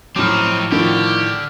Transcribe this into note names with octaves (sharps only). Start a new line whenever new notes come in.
A2 F3 F#3 C4 D#4 D6 F6
A2 D3 D#3 F3 G4